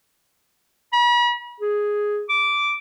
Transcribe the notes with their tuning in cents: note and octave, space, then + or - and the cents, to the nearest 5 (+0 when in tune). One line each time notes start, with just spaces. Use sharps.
B5 -40
G#4 +0
D6 -10